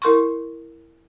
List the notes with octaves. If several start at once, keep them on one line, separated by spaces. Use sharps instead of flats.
E4 A#4 C6 C#6